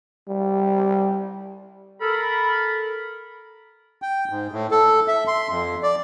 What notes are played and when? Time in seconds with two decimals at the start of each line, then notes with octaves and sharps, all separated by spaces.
0.28 G3
2.01 A4 A#4 B5
4.02 G5
4.29 G#2
4.52 A2
4.71 A4
5.08 E5
5.28 C6
5.49 F2
5.83 D5